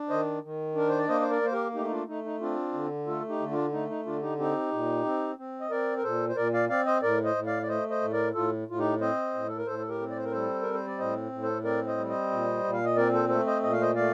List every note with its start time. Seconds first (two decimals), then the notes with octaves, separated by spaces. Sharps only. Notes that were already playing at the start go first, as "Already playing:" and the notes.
Already playing: D4
0.09 D#3 C5 D#5
0.43 D#3
0.75 D4 A#4
0.89 C5
0.98 D5
1.08 A#3 C5 D#5
1.21 C5
1.30 A#4 D5
1.41 A#3 C5
1.52 G4 A#4
1.75 A3 D#4 G4
1.85 D#4
1.91 D4 F4
2.08 A3 D#4
2.25 D#4
2.40 C4 D4 F4
2.73 D3
3.07 A3 F4 A4
3.29 D#4 G4
3.40 D3
3.51 D4 F4
3.72 A3 D#4
3.89 D#4
4.06 D3 D4 F4
4.22 D#4 G4
4.39 C4 D#4 G4
4.71 A#2
5.05 C4
5.38 C4
5.61 D#5
5.71 C4 A#4 D5
5.97 A#4
6.03 A#2 A4 C5
6.29 C5
6.36 A#2 A#4 D5
6.54 D5 F5
6.69 C4 D5 F5
6.86 C5 D#5
7.02 A2 A#4 D5
7.24 C5 D#5
7.36 A2
7.47 D5 F5
7.62 D5
7.69 A3 C5 D#5
7.90 C5 D#5
8.01 A2
8.12 A#4 D5
8.34 A2 F4 A4
8.68 A2 F4
8.79 D#4 G4
9.01 C4 C5 D#5
9.34 A2
9.48 A4
9.57 A#4
9.67 A2 A4 C5
9.79 A4
9.89 G4 A#4
10.00 C4
10.10 D5
10.17 C5
10.25 A#4
10.32 G3 A4 C5
10.62 C4 A#4
10.74 C5
10.87 D5
10.99 A2 C5 D#5
11.32 A2
11.43 A4 C5
11.64 C4 A#4 D5
11.87 C5 D#5
11.98 G3
12.09 C5 D#5
12.31 A#2
12.64 A#2
12.73 F5
12.85 D#5
12.96 C4 A#4 D5
13.13 A4 C5
13.29 A3 A4 C5
13.46 C5 D#5
13.63 A#2 D#5
13.73 F5
13.81 C5 D#5
13.95 A3 D5 F5